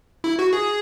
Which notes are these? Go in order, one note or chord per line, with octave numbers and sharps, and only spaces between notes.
E4
F#4
G#4